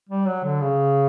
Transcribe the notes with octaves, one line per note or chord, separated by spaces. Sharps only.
G3
F#3
D3
C#3